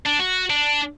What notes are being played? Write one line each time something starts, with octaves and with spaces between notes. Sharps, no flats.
D4
F#4
D4